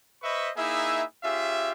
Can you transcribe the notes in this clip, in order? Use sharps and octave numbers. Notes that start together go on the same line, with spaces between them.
B4 C5 D#5 E5 B5 C#6
A#3 D#4 E4 G#4 E5
C#4 F4 G4 G#4 E5